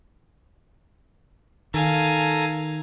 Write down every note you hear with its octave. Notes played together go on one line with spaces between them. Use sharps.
D#3 A4 F5 G#5 A#5